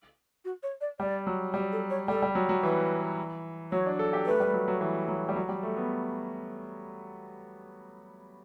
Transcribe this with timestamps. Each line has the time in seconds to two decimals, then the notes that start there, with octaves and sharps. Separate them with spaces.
0.45 F#4
0.63 C#5
0.81 D5
0.99 G3 D5
1.27 F#3
1.53 G3 G4
1.72 A4
1.90 C#5
2.08 G3 A4
2.22 G3
2.35 F#3
2.49 F#3
2.63 E3 B4
3.72 F#3 C#5
3.86 D4
3.99 A4
4.13 G4
4.26 A3 B4
4.40 G3
4.54 F#3
4.68 F#3
4.81 E3
5.08 F#3
5.29 G3
5.36 F#3
5.49 G3
5.63 A3
5.77 B3